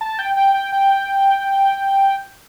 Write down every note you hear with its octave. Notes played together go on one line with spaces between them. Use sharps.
A5
G5
G5
G5
G5